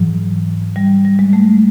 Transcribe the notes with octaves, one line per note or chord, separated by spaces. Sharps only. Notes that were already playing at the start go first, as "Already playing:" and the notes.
Already playing: G#2 E3 F#3
G3
G3
G#3
A3